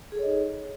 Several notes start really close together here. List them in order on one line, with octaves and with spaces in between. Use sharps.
G#4 A4 C#5 D#5 D#4